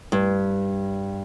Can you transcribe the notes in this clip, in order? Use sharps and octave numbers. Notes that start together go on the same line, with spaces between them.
G2